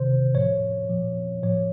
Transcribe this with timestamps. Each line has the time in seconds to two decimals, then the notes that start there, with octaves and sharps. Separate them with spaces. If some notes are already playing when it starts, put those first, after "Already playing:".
Already playing: C3 D#3 C5
0.34 A2 F3 C#5
0.89 A#2 F3
1.43 A2 F3 C#5